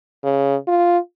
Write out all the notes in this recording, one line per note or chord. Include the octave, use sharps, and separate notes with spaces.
C#3
F4